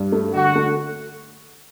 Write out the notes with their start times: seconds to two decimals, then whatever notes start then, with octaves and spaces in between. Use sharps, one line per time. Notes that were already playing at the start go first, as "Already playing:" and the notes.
Already playing: G2
0.12 A3
0.33 D3 F#4
0.56 A3